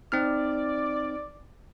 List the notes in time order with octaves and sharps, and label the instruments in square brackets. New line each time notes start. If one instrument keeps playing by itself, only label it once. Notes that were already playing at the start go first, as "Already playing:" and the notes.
[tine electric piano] C4 D#4 F6 [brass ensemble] D5